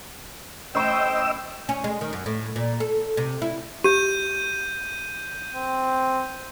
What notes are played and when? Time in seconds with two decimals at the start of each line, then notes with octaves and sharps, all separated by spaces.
0.75 A1 A2 C5 D#5 G5 C#6 E6
1.69 C#4
1.84 G#3
2.01 D#3
2.13 F#2
2.26 A2
2.56 A#2
2.80 A4
3.17 C3
3.42 E4
3.84 G4 G6 D#7
5.55 C4